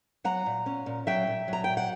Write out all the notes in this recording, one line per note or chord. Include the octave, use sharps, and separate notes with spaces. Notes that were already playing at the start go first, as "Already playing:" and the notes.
F#3 F#5 A#5
A#2
C#4
A#2
F#3 E5 G5
A#2
F#3 A#5
A#2 G5
F#5